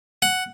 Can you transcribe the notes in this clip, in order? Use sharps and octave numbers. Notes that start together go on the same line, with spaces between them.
F#5